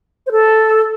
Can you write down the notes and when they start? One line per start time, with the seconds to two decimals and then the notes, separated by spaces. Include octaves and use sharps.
0.27 C5
0.32 A4